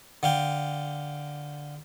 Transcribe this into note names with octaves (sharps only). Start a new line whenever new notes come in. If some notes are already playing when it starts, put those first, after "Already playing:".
D3 F5 G5